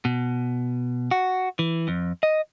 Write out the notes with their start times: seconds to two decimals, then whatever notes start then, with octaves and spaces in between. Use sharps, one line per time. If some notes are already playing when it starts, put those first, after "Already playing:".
0.05 B2
1.11 F#4
1.59 E3
1.88 F2
2.23 D#5